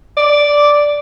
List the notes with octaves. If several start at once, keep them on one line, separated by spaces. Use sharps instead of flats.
D5